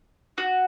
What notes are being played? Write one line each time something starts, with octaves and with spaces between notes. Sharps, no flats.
F#4